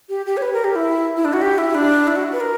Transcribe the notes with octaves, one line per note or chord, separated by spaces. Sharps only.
G4
G4
C#5
B4
A#4
G4
E4
E4
D4
F#4
G4
E4
D4
E4
F#4
B4
A#4